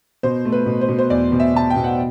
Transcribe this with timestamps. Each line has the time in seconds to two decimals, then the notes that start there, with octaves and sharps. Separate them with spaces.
0.23 B2 C5
0.45 A3
0.52 B4
0.66 B2
0.81 C5
0.89 B2
0.99 C5
1.10 E2 D5
1.32 B2
1.40 E5
1.54 B2 A5
1.70 G5
1.76 B2
1.84 F#5